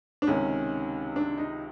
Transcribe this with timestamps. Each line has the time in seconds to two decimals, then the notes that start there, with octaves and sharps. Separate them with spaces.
0.22 D4
0.27 C#2 C3 D#3 C#4
1.16 D4
1.38 D#4